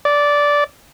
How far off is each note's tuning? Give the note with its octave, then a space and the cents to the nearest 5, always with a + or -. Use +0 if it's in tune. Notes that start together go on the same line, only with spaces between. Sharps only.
D5 -10